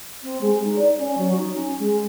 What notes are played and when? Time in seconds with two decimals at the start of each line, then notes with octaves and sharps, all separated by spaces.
0.23 C4
0.41 G#3
0.63 D#4
0.78 D5
0.98 C#4
1.17 F#3
1.37 D#4
1.54 C#4
1.79 G#3